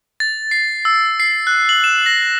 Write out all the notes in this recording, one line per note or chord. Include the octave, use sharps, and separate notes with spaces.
A6
C7
E6
C7
F#6
F#7
E7
A#6